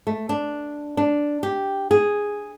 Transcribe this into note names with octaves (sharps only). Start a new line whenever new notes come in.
A3
D4
D4
G4
G#4